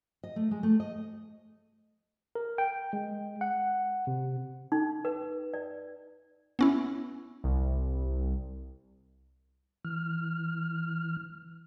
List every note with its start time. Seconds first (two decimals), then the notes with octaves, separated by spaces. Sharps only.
0.24 D#5
0.36 A3
0.51 G#3
0.63 A3
0.80 D#5
2.35 A#4
2.58 G5
2.93 G#3
3.41 F#5
4.07 C3
4.72 D#4
5.05 B4
5.54 D5
6.59 B3 C#4 E4
7.44 C2
9.85 E3 F6